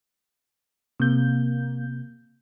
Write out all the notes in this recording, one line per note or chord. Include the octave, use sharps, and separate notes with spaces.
C3 A#3 G6